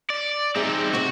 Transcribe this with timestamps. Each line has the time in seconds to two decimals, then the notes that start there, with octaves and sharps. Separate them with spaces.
0.10 D5
0.56 G3 C4 D#4 G#4 E5
0.93 E2 C3 F#4